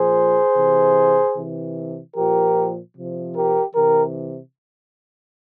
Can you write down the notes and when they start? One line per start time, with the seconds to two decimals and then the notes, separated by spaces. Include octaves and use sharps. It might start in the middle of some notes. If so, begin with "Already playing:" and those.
Already playing: A#2 F3 G#4 C5
0.57 C3 E3
1.37 C3 E3
2.16 A#2 F3 G4 A#4
2.97 C3 F3
3.36 G4 A#4
3.76 C3 E3 G4 A#4